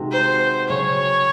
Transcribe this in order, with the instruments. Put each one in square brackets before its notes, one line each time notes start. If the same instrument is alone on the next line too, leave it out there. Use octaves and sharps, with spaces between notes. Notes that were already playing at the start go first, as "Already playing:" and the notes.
Already playing: [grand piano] C3 D#3 G#3 C4 F#4
[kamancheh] C5
[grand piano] C#3 F#3 C#4 [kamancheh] C#5